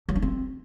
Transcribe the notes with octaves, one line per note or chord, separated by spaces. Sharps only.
F#3
D4
C4